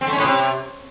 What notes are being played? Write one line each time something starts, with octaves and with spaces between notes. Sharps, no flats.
C4
A3
C#4
A2
C3